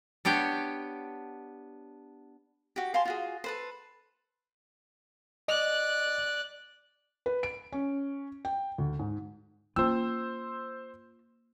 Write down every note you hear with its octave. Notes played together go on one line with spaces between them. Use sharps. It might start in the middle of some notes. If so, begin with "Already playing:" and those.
B3 D4 G4 C#5 G5
F#4 G4
F5 G#5 A5 C6
F4 F#4 G#4
A4 B4 C5
D5 D#5 F#6
B4
D7
C#4
G5
D2
G#2
A#3 C#4 F4 C5 E6